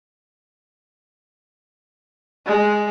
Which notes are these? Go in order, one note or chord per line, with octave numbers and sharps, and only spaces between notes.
G#3